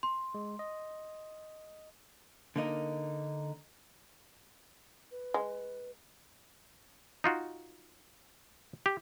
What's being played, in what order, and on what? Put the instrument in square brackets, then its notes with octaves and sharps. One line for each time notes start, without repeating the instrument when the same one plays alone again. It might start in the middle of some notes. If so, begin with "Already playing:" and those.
[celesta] C6
[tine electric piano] G#3
D#5
[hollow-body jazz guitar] D3 A#3 D#4 A#4
[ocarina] B4
[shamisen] G#3
[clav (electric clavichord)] D#4 F4 F#4
G4